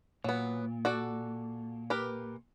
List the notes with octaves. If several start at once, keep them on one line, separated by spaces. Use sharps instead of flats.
A#2 F#3 B3
F#4 A4 D5
G4 A#4 B4